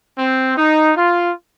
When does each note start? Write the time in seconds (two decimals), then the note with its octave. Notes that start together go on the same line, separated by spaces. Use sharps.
0.18 C4
0.57 D#4
0.96 F4